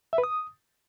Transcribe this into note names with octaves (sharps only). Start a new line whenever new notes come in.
E5
B4
D#6